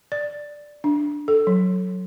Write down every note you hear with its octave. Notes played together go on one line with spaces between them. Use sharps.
D5
D4
A4
F#3